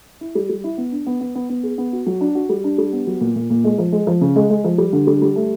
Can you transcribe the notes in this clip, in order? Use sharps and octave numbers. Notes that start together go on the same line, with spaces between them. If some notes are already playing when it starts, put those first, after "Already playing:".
E4
G3
G3
E4
B3
D4
B3
B3
B3
B3
G#4
B3
F#4
F#3
D4
F#4
G3
D4
G3
B3
F#3
A#2
A#2
A#2
G#3
F3
G#3
F3
C#3
G#3
G#3
F3
G3
D3
G3
G3
A3